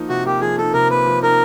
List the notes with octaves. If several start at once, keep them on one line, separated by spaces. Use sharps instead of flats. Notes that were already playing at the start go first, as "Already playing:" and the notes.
Already playing: F3 A#3 D#4
C3 F#4
A#3 G4
F3 G#4
D#4 A4
C3 A#4
A#3 B4
F3
D#4 A#4